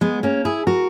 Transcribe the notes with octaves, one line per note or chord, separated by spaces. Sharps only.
G#3 B3
A#3 C#4
E4 G#4
F#4 A#4